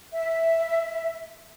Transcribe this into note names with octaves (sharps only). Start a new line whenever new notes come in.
E5